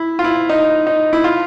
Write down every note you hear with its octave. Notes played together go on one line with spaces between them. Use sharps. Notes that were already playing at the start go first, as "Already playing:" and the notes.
Already playing: E4
F4
E4
D#4
D#4
E4
F4